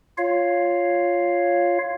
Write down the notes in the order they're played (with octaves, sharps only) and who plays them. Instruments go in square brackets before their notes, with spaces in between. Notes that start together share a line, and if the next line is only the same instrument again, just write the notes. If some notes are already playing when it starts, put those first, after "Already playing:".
[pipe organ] F4 C#5 F5